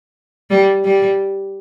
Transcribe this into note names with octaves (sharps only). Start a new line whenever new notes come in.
G3
G3